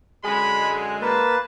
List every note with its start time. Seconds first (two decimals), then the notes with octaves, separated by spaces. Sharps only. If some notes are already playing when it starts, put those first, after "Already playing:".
0.25 F#2 D3 G#3 G#4 B5
1.02 A#3 B4 A5